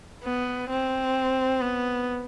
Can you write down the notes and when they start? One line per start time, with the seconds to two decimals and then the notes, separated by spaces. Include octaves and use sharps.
0.24 B3
0.70 C4
1.61 B3